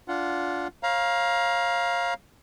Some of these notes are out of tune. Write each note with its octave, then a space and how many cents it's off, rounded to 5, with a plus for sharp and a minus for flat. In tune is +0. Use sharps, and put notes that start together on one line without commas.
D4 -20 F4 +0 F#5 +0
C#5 -40 F5 +0 A#5 +30